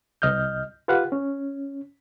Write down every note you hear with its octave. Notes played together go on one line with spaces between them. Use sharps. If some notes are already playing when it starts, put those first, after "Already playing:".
C2 D#5 F6 G6
F4 G4 B4 F5 F#5
C#4